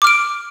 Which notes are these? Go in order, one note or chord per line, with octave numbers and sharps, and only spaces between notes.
D6 F6 D7